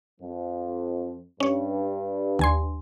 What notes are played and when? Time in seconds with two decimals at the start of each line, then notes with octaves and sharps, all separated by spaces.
0.21 F2 F3
1.40 G2 C#4 C#5
2.39 D#2 G#5 C6